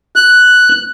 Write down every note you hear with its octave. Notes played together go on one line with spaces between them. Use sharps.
F#6